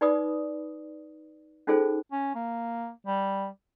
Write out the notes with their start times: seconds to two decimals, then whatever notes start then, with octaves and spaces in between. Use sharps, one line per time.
0.01 D#4 B4 D5 B5 D6 D#6
1.67 C#4 D#4 F4 G#4 A4 C5
2.12 C#4
2.35 A#3
3.06 G3